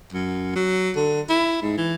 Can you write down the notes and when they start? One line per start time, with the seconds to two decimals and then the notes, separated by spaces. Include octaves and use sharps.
0.13 F#2
0.56 F#3
0.96 D3
1.30 E4
1.62 G#2
1.78 E3